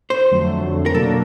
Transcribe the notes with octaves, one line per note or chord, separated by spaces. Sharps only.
C5
F2 D3 F#3 A3
A#4
B2 F#3 A#3 D4 A4